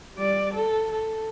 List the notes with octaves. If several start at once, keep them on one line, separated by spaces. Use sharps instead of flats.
G3 D5
A4
A4